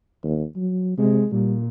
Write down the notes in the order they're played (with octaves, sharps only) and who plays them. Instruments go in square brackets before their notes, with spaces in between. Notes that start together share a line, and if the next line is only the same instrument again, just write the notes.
[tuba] D#2
F#3
[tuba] C3 [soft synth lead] G#3
[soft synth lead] A#2 [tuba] G3